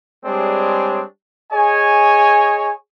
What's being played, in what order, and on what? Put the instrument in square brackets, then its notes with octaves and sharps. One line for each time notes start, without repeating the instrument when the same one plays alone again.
[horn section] G3 G#3 C4 D4 G#4 C#5
G#4 C#5 D#5 G#5